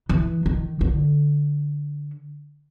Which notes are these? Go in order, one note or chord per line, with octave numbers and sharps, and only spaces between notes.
E3
D#3
D3